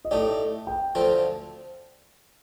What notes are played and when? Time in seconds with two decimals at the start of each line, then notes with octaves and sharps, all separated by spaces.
0.05 D#5
0.11 A2 A3 D#4 G4 D5
0.67 G5
0.95 D2 D3 F3 C4 F4